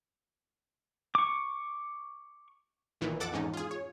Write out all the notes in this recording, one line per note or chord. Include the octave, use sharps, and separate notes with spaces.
C#6 D6
B1 A#2 D#3 E3
F2 A4 F#5 D6 A6
E2 G#2 C#4 D#4
F4 G#4
C#5